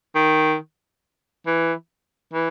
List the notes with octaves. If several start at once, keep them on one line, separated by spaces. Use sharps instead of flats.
D#3
E3
E3